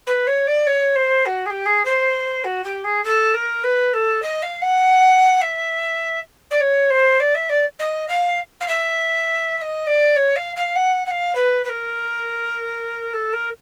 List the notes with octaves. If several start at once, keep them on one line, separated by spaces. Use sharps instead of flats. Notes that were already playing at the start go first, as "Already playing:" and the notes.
B4
C#5
D5
C#5
C5
F#4
G#4
G4
G#4
C5
F#4
G4
G#4
A4
A#4
B4
A4
D#5
F5
F#5
E5
D5
C#5
C5
D5
E5
D5
D#5
F5
F5
E5
E5
D#5
D5
C#5
F5
F5
F#5
F#5
F5
B4
B4
A#4
A4
A#4